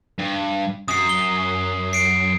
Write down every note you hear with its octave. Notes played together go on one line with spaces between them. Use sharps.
G2
F#2 D#6 C7
G7
C7 D7